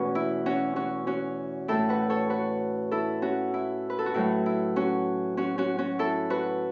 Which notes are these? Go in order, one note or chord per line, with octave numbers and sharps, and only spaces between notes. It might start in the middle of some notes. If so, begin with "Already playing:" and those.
Already playing: E2 B2 A3 C#4 F#4 B4
E4
C#4 F#4
C#4 F#4
C#4 F#4
A2 A3 E4 A4
F#4 B4
A4 C#5
F#4 B4
E4 A4
C#4 F#4
E4
B4
A4
F#4
A2 F#3 A3 E4
E4
C#4 F#4
C#4 F#4
C#4 F#4
C#4 F#4
E4 A4
F#4 B4